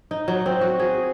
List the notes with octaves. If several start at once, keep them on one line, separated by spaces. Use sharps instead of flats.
D#4
F#3
C4
F#4
G#4